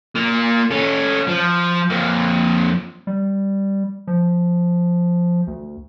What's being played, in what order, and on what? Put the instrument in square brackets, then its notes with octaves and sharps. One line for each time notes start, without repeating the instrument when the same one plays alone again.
[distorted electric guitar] A#3 F4
C#4 A4
F3
F2 A#3
[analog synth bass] G3
F3
D2